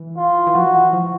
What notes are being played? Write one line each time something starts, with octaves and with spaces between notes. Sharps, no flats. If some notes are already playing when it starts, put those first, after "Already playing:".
Already playing: E3
F4
E3
F3 F#4
E3
F3